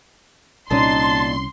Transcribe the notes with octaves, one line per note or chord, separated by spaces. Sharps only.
C2 A#2 C#4 D#4 A5 C6